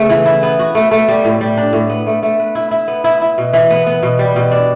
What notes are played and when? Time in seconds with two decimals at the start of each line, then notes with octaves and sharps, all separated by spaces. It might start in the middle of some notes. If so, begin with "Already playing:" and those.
Already playing: C#3 A3 B3
0.10 E3
0.26 E4
0.43 B3
0.59 F#4
0.75 A3
0.91 A3
1.08 G3
1.25 A2
1.41 G3
1.57 D4
1.73 A2
1.90 B3
2.07 A3
2.23 A3
2.40 B4
2.55 E4
2.71 E4
2.88 B3
3.04 E4
3.22 E4
3.38 B2
3.53 E3
3.70 B3
3.87 B3
4.03 B2
4.19 G3
4.36 B2
4.51 D4